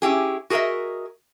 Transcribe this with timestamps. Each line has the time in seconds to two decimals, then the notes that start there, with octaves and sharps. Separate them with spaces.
0.02 C#4 E4 G4 G#4
0.50 F#4 G#4 A#4 C#5 D#5 E5